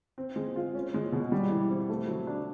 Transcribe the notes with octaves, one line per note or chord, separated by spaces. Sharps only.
C4
G#3
F4
C#4
G#3
B2
G3
E3
C4
A3
F#3
D4